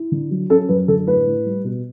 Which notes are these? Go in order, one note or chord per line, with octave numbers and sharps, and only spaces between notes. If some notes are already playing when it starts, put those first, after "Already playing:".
Already playing: E4
D3
F#3
C#4 A4
F#2 B4
D3 A4
A2 B4
A2
G3
B2